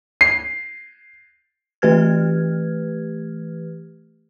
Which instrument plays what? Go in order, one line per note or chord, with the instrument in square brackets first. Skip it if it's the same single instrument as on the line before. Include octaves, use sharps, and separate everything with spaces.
[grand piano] C7
[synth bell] E3 A3 G4 B4 F6 G#6